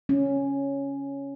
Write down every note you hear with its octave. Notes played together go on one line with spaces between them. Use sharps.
C#4